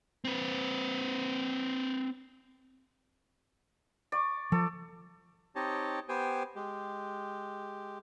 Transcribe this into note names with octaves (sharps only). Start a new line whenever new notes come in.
C4 B4
D5 C#6
F3 A4
C4 D#4 G4 C#5 D#5 A5
B3 G4 C5 G5 G#5
G#3 G4